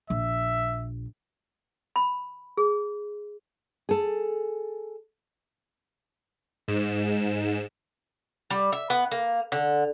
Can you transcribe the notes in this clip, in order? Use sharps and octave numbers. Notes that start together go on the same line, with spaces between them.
A#1 E5
B5
G#4
G#4 A4
G#2 E7
G3
E5
B3
A#3
D3